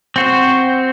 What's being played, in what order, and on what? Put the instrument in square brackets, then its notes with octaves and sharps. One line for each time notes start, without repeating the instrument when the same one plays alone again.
[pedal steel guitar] C4 F#4 C5